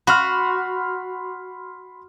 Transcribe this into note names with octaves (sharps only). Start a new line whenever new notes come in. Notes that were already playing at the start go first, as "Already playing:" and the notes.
F#4 B5 C6 F6